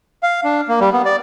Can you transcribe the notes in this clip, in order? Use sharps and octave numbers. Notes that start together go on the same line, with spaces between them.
F5
D4
A#3
G3
B3
D5